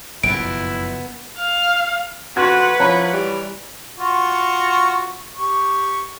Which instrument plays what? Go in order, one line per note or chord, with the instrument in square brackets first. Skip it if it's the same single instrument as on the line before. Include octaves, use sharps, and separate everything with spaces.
[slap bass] F#1 F2 B2 [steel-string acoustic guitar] B3 [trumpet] E4 [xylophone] D7
[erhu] F5
[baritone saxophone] F2 [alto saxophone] F#4 [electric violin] B4 F#5 [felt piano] C6 C#6 G#6
[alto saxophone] F3 [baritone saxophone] E4 [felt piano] C#5 A#5 B5
[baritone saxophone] E3 [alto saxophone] G3
[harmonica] F4 F#4 C#6
G4 C#6